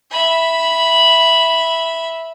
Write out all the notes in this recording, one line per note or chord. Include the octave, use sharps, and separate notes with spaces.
E5 B5